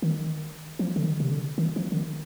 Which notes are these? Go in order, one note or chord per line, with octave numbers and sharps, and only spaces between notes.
D#3
F3
D3
D#3
C3
D3
D#3
F3
D3
D#3